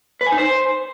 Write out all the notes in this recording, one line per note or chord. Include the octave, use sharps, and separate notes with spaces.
B4
G#5
D#4
C5